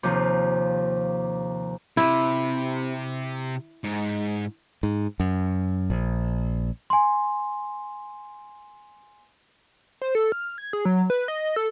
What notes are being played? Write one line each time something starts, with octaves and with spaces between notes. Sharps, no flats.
D#2 C3 F3
C3 E4
G#2
G#2
F#2
A#1
G#5 C6
C5
A4
F6
G#6
G#4
F#3
B4
D#5
A4